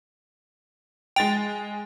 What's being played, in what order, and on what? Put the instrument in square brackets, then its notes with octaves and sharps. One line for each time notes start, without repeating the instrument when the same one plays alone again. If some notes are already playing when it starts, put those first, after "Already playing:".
[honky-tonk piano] G#3 A6 F7 [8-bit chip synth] G5